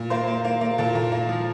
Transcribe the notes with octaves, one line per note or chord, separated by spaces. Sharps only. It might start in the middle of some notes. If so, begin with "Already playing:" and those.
Already playing: A#2
A#3 C5
A#3
A#3
A#3
A#2 A4
A#2
A#3
F3